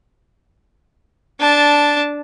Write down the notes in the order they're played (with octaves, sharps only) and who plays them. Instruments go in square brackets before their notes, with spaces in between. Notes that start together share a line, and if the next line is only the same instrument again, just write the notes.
[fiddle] D4 A5